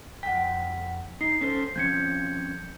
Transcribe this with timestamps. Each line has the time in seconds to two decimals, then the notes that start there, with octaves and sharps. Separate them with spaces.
0.23 F2 F#5 G5 B6
1.21 D#4 C7
1.41 C#4 A4 C5
1.76 F3 C4 C#4 G6 G#6 C#7